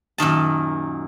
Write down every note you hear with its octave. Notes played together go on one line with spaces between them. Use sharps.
F#2 A#2 D#3 A5